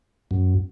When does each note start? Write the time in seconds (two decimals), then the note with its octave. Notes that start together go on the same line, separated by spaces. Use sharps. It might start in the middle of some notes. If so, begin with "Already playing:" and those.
0.31 F#2